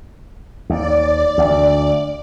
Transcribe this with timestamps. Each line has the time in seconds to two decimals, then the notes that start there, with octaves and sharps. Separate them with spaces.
0.70 D#2 D5
1.38 D2